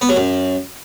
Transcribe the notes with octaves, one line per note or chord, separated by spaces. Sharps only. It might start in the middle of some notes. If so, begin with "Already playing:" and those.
B3
F#3
F#2